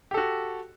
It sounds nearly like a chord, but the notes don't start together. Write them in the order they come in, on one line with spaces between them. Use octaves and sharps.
G4 A4 F#4